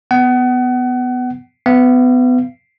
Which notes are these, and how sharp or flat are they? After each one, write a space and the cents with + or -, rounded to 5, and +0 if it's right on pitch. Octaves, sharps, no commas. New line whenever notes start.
B3 +10 F#5 +30
B3 +25 F5 -40